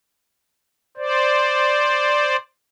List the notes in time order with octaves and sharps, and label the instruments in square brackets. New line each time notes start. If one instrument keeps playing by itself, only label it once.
[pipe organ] C5 D5